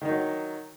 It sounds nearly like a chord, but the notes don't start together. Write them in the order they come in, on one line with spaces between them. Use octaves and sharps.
D#3 D#4 F#3